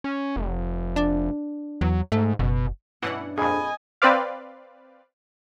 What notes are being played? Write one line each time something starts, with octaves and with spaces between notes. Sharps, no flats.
C#4
F1
D4
E2 F#3
G#2 A3
F#1 B2
G2 B2 E3 C#4 D4 E4 F#5
A#1 F2 G#4 D#5 G#5 B5
C4 B4 C5 D5 F5